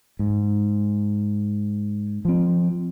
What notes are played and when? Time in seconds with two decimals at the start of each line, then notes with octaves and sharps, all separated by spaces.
0.19 G#2
2.25 F3 C4